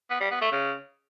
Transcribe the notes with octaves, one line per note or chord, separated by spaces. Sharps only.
B3
G3
B3
A3
C#3